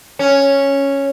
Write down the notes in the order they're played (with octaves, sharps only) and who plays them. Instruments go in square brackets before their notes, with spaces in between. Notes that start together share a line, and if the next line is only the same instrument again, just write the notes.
[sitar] C#4